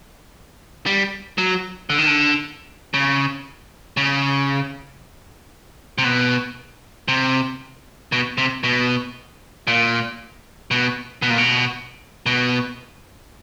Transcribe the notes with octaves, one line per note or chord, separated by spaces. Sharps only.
G3
F#3
D3
D#3
D3
C#3
C#3
C3
B2
C3
B2
C3
B2
A#2
B2
B2
A#2
B2
B2